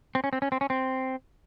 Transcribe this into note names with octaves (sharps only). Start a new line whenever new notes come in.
C4
C#4
C4
C#4
C4
C#4
C4